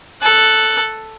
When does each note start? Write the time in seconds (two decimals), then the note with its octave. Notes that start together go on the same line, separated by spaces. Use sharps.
0.22 A4 F#6